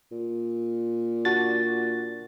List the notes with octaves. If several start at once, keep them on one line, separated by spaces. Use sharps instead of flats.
A#2
D4 F#4 A6